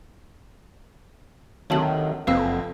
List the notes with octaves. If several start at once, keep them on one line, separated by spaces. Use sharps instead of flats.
D2 C3 D#3 F#3 C#5 A5 F#7
F#1 F2 C4 B4 F5 E6